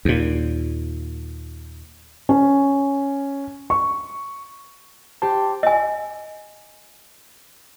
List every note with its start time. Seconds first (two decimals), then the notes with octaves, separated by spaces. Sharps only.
0.05 D#2 A#2
2.29 C#4
3.70 C#6
5.22 G4 C5 A5
5.63 D#5 G#5